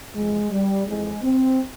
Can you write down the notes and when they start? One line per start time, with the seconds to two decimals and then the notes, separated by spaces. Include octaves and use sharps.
0.15 E2 C3 F3 G#3
0.51 G3
0.86 F2 E3 G#3
1.22 C4